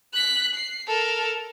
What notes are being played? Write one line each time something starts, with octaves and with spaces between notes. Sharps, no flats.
F#6 B6
C7
A4 A#4